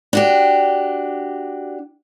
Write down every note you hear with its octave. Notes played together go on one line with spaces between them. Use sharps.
D4 F#4 G4